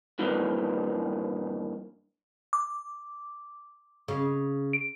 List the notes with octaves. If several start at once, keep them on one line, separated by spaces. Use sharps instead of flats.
G2 A#2 D#3 E3
D6
C#3
D7